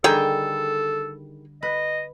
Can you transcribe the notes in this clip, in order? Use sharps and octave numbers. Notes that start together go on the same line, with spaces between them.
D3 D#3 G3 G#4 A4 G5
B4 D#5